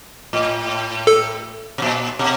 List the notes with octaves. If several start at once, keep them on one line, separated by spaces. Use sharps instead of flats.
A2
A4
B2
A#2
B2